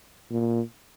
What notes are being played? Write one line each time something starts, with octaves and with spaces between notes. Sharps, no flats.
A#2